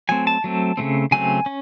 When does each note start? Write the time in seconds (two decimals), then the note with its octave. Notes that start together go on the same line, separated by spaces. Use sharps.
0.09 F#3 A3 C4 G#5
0.27 A5
0.44 F#3 A3 C4
0.77 C#3 F#3 A3 C4
1.11 C#3 F#3 A3 C4 G#5
1.46 C#4